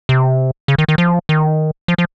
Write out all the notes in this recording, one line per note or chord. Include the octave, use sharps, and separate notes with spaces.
C3
C#3
D#3
D#3
F3
D#3
F3
F3